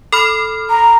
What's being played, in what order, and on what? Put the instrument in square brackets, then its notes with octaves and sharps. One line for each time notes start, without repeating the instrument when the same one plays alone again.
[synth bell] A4 B5 F6
[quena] A#5